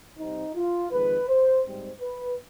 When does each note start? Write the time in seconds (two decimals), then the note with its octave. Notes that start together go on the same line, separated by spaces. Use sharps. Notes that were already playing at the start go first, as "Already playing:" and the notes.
0.18 C3 G3 C4 D#4
0.55 F4
0.91 F2 D#3 G#3 B4
1.28 C5
1.65 G#2 G3 C4
2.01 B4